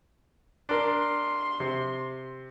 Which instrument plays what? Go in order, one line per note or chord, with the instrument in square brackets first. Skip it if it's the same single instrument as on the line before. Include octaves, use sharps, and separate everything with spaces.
[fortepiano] D4 A#4 [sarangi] C6
[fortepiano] C3